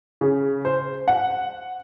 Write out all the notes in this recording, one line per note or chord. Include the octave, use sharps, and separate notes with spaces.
C#3
C5
F#5